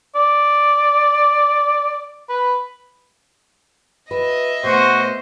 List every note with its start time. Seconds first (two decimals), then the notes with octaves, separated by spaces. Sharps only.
0.15 D5
2.29 B4
4.11 F#4 B4 D#5 E5
4.63 B2 A3 B3 F#4 C5